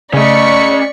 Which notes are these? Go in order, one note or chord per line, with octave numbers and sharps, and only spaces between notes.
C#3 A3 C#4 D5 D#5 C#6 B6 C#7